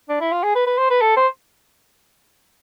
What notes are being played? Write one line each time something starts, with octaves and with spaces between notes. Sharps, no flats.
D4
E4
F4
G#4
B4
B4
C5
B4
A4
C5